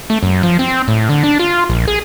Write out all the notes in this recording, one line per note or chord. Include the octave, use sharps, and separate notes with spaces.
A3
F#2
F3
C4
A2
D3
D4
F4
A#1
G#4